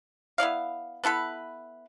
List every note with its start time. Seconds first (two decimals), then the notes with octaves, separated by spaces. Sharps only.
0.38 B3 E4 D5 F5
1.04 B3 E4 A4 B4